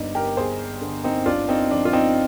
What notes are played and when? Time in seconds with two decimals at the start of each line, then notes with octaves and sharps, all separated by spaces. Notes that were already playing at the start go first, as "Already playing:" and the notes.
Already playing: G1 G2 D4 D#4
0.15 G4 A#4
0.37 G1 G#4 C5
0.81 D3
1.04 C4 D#4
1.26 G1 D4 F4
1.49 C4 D#4
1.71 F3 D4
1.85 F4
1.93 C4 D#4